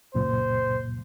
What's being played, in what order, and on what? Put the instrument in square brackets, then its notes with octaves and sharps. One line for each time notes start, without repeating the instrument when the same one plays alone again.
[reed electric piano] C#2 F#2 A#2 [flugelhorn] C5